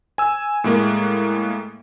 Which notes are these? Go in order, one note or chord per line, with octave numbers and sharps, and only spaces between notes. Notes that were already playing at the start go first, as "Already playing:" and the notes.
G#5 E6
A2 G#3 A#3